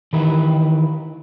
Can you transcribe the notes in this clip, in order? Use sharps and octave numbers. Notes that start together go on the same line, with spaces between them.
D#3 E3 G4 A#4 B4